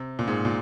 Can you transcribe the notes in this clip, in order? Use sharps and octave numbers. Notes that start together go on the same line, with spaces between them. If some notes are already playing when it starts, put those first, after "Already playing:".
Already playing: C3
A#2
G#2
A#2